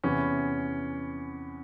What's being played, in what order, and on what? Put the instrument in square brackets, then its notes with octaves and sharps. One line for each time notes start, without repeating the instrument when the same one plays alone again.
[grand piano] E2 C3 E3 C#4